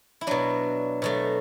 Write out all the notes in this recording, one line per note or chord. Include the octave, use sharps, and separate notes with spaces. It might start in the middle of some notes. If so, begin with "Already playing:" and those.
E4
B2 F#3 D4
B2 F#3 A3